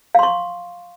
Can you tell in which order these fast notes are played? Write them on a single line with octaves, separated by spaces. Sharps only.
F5 C6 C#6